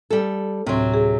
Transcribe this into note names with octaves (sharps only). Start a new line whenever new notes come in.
G3 A4
D2 A2 C3 F#3 C6
G#4